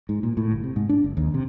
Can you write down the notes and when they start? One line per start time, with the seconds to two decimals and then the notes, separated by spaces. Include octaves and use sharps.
0.09 G#2
0.23 A#2
0.37 A2
0.52 G1
0.64 C3
0.76 G#2
0.89 D4
1.04 F#1
1.17 D#2
1.34 C3